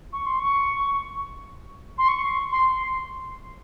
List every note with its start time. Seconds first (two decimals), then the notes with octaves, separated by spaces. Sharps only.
0.13 C#6
0.26 C6
0.40 C#6
1.98 C6
2.08 C#6
2.52 C6